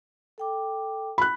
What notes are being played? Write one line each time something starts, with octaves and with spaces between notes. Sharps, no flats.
A4 G5 D6
B5 F#6